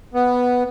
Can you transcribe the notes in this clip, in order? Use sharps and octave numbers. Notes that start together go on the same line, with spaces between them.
B3